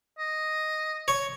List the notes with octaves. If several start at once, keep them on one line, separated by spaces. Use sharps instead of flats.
D#5
C#5